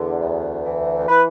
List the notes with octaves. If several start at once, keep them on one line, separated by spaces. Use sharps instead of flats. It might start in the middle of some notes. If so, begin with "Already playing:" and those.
Already playing: E2 D3
D2
E3
E3 B4